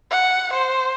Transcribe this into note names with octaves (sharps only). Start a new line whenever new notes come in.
F#5
C5